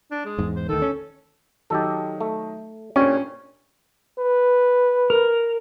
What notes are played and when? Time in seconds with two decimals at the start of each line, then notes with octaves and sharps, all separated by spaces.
0.11 D4
0.25 G#3
0.39 E2 G#2
0.56 C5
0.69 D2 D#3 A4
0.82 C#4
1.70 D#3 F#3 D#4 G4 A4
2.21 A3
2.96 A#2 C#4 D4 G4 C5 C#5
4.19 B4
5.10 A#4